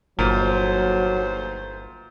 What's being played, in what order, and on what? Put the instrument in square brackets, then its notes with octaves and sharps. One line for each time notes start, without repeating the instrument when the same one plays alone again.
[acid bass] G1 [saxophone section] D#2 A3 C5 [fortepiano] A#2 [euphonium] F#3